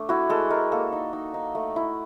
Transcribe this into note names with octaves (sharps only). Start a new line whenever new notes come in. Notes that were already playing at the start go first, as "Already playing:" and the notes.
Already playing: A3 D4
E4 F#4
G#3 A4
G#3 A#4
A#3 A4
D#4
D#4
D#4
A3
E4